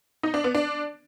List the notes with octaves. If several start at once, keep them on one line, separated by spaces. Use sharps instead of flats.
D#4
D4
B3
D4